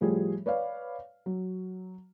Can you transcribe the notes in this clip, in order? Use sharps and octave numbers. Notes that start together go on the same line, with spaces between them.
A2 F3 G3 G#4
B4 C#5 D5 F5
F#3